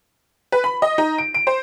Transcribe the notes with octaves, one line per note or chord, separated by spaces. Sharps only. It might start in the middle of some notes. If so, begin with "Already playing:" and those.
B4
B5
D#5
D#4
D7
D7
C5